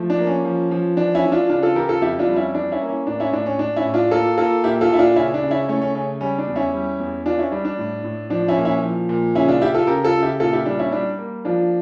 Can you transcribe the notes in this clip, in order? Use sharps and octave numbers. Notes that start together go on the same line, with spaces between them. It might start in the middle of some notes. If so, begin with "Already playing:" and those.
Already playing: F3 A3
D4
A#3
C#4
F3
F3
E3 D4
C#4 E4
E3
D4 F4
C#3 D4 F4
F4 A4
E3 G4 A#4
F4 A4
F2 E4 G4
D4 F4
G3
C#4 E4
E3 D4
C#4 E4
A#3
C#4
A2 D4
C#4 E4
A2 D4
C#4
A2 D4
C#4 E4
A2
D4 F4
A#3 F4 A4
A#3 F4 A4
A#2 E4 G4
F4 A4
A#2 E4
D4 F4
C#3 C#4 E4
D4
C#3
C#4 E4
A3 C#4
C#4
C#3 C#4
G3 C#4
D4
E2
C#4 E4
G3
E2
E3 D4 F4
C#4 E4
G3 D4
D4
A2
A2
F3 D4
C#4 E4
A#2
C#4 E4
F3
A#2
C#3 C#4 E4
D4 F4
C#3 E4 G4
F4 A4
C#3 G4 A#4
F4 A4
C#3
E4 G4
A#2 F4 A4
E4 G4
G3 D4
C#4 E4
G3 D4
A#3
F3 D4 F4